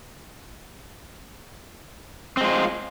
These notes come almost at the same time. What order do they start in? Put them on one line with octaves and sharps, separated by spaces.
C4 G#3 F4